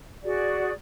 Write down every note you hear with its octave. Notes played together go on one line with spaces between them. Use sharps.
F#4 G#4 D5